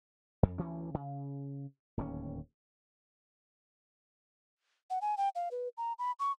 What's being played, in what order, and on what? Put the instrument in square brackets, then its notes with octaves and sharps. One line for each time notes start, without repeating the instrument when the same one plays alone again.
[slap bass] F2
D2 E3 C#4
C#3
D1 D#2 C4 C#4
[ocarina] F#5
G#5
G5
F5
B4
A#5
B5
C#6